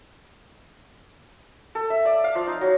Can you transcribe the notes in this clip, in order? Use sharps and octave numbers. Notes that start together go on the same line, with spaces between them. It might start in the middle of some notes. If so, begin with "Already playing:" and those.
A4
E5
D5
F5
F3
D#4
F#3